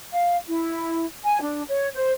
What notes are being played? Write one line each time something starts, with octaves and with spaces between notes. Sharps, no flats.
F5
E4
G#5
D4
C#5
C5